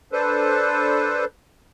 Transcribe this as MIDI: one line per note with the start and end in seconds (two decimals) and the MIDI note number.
0.12 1.25 62
0.12 1.25 69
0.12 1.25 71
0.12 1.25 72